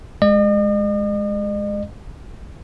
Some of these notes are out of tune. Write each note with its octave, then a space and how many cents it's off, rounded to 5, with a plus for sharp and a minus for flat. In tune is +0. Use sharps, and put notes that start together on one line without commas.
G#3 +0 D#5 -45